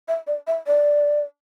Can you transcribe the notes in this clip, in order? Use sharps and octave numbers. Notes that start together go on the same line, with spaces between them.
E5
D5
E5
D5